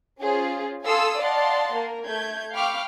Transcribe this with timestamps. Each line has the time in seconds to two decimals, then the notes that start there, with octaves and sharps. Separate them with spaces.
0.20 C#4 F4 G#4 C5
0.85 A4 F5 G#5 C6 D#6 E6
1.19 D5 D#5 F5 F#5 A5 C6
1.75 A#3 A#4
2.07 A3 G6 G#6
2.53 F5 G5 B5 C#6 D6 F6